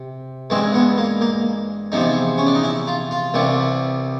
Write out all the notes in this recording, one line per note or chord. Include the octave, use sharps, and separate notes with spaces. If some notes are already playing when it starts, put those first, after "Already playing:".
Already playing: C3
G2 E3 G#3 C4
B3
A#3
A#3
E2 C3 F3 D#4
C#4
D4
D#4
E4
F4
F4
C2 C3 E3 G3